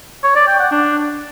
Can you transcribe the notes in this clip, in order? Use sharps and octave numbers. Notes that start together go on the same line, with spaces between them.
C#5
D5
G5
F#5
D4